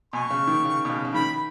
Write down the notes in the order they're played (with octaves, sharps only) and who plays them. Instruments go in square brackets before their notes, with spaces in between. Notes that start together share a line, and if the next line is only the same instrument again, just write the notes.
[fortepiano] B2 [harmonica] G#5 C#6
[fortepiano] C#3
D#3
C#3
B2
C#3
C#3
[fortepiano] D#3 [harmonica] B5